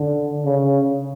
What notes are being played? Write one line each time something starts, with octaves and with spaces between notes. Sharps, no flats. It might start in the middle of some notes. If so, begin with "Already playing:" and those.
Already playing: D3
C#3